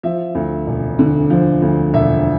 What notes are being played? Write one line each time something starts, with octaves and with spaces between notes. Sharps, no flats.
F3 E5
D2
E1
D3
F3
D2
E1 E5